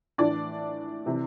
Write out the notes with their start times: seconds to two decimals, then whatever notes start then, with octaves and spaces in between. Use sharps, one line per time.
0.18 A2 E3 D4 D5
1.06 C3 E3